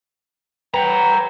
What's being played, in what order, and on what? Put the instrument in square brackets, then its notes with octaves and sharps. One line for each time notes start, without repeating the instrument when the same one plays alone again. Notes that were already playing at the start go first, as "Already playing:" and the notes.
[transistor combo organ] B4 [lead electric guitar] F#5 A#5 [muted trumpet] G5